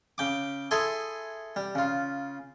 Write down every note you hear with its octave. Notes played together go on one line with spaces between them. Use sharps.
C#3 G5 D6
E4 G#4 A4 G#5 C6
G3
C#3 F4